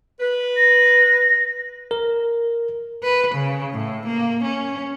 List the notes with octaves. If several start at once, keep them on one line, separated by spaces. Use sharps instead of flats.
B4
A#6
A#4
B4
C#3
A2
A#3
C#4